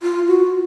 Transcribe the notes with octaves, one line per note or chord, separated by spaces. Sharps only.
F4
F#4